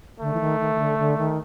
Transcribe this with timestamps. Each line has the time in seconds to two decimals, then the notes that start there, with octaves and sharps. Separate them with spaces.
0.20 D3 A3
0.34 E3
0.40 D#3
0.60 D#3
0.75 D#3
0.79 D3
0.98 D3
1.17 D#3